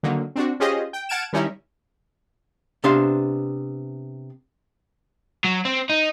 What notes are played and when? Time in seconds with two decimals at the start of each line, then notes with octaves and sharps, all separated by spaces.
0.03 D3 D#3 F#3 A#3
0.36 C4 D4 F#4
0.60 C#4 F4 G4 G#4 C5 D#5
0.93 G5
1.09 F#5 A5 F6 G#6 D7 E7
1.33 D#3 G3 C#4 D#4 E4
2.84 C3 B3 D4 C5 F5 C6
5.44 F#3
5.65 C4
5.89 D#4